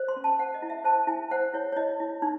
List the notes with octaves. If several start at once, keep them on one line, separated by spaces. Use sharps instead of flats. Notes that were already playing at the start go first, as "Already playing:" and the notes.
Already playing: C5
C6
C#4
A5
C5 F#5
D#5
E4
E5
C5 A5
E4 G#5
C5 F#5
E4 C#5
C#5
E4 D#5
E4
D#4